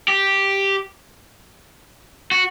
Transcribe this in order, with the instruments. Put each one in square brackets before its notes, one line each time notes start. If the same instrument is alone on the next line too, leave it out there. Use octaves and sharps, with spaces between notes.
[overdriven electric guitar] G4
F#4